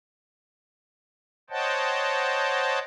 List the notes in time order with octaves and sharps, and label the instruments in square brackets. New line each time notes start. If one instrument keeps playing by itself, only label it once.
[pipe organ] C5 C#5 D#5 F#5 G5 A5